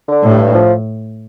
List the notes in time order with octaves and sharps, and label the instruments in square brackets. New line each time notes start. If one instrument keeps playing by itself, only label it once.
[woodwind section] D3
[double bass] A2
[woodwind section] G2
F3